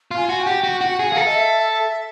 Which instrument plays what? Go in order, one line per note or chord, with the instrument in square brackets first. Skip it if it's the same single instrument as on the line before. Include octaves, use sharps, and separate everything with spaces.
[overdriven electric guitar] F4
[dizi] G#5
[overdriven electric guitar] F#4
[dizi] G5
[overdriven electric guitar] G4
[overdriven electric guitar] F#4 [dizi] G5
[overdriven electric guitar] F#4
[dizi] F#5
[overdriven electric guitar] G#4
[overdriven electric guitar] G#4 [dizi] F5
[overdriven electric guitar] A4
[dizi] D#5
E5